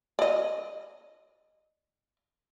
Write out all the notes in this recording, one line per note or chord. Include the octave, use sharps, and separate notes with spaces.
D5 D#5